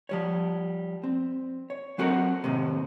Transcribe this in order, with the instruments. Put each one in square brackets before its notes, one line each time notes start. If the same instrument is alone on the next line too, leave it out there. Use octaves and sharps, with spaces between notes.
[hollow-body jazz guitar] F3 G3 C#5
C4
C#5
F#3 C4 F#4 A4 A#4
D#2 A2 C3